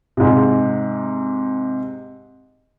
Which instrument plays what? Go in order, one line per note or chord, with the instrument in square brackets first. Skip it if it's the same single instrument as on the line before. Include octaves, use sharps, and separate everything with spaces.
[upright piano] G#2 C3